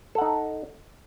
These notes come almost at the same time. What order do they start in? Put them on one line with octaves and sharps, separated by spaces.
A4 F#5 D#4